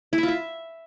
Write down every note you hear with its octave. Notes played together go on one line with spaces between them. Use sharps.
E4
E5
F4
E5